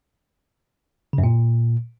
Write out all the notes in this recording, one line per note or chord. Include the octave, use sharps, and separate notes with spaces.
C#3
F#2
A#2